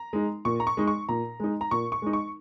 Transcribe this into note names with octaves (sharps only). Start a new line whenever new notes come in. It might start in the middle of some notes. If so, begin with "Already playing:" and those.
Already playing: A#5
G#3 D#4
A#2 C#6
A#5
C#6
G#3 D#4
C#6
A#2 A#5
G#3 D#4
A#5
A#2 C#6
C#6
G#3 D#4
C#6